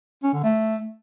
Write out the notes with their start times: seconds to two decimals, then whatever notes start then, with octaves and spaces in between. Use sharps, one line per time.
0.23 C#4
0.33 D3
0.43 A3